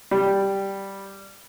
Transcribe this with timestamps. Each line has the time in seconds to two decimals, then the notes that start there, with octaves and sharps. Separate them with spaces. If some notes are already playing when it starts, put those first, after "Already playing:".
0.11 G3